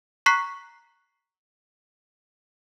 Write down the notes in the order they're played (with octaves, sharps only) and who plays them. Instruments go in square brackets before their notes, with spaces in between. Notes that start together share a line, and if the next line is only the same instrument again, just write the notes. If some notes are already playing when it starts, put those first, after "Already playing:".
[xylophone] A#5 C#6 F#6 B6 C7